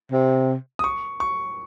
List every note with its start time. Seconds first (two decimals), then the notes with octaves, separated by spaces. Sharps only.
0.12 C3
0.79 D#6
0.84 C#6
1.20 C#6